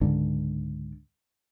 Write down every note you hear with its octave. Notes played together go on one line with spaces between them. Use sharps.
C#2 G#2 D3